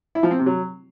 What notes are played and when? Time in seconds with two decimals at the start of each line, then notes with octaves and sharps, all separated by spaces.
0.15 E4
0.23 F3
0.31 C4
0.39 C3
0.46 F#3